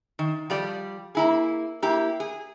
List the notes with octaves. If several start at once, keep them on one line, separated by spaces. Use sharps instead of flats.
D#3
F3 G3 D5
A#3 E4 G#4
A#3 E4 G4
G#4